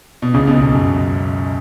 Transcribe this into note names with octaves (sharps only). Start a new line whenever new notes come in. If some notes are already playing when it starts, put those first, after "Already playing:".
B2
C#2 C#3
B1 B2
B1 B2
F#2